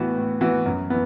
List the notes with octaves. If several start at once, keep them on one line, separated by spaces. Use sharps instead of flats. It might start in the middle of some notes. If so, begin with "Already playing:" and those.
Already playing: A2 E3 B3 F#4
A2
E3 B3 F#4
F#2
E3 B3